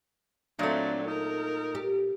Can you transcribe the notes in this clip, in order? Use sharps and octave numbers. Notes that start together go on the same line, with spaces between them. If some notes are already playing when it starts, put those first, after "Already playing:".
A#2 F#3 A3 C4 D4
D#4 A#4
G4